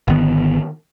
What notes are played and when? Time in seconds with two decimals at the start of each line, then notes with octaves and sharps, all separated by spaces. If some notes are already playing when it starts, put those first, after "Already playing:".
0.08 G#1 D3 D#3 B3